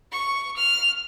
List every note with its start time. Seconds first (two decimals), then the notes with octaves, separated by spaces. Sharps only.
0.12 C#6
0.56 F6